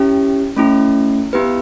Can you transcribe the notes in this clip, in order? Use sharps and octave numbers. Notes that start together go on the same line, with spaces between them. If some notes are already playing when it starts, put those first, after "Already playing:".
Already playing: C#4 E4 G4
A3 C#4 E4
B3 E4 G4 B4